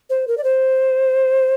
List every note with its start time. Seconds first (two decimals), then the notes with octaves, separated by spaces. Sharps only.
0.10 C5
0.28 A#4
0.38 D5
0.44 C5